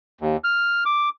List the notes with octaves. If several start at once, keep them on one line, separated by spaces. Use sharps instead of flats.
D#2
F6
D6